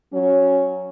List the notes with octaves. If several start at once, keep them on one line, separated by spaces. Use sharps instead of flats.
F#3 C#4